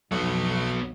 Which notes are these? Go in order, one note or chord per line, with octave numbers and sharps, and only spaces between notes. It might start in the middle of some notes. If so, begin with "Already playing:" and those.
B1 F2 F#3 A3 B3